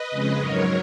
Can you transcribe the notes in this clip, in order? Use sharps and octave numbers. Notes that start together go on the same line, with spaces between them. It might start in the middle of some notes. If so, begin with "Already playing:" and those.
Already playing: B4 D#5
F2 C#3 G#3
G#2 F#3 A#4 C#5